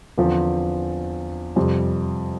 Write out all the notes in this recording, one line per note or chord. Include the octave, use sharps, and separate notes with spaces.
E2 D3 F3 C4
F2 C3 G3